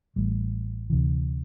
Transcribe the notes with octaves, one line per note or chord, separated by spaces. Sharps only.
A1 A2 G3
D2 C3 E3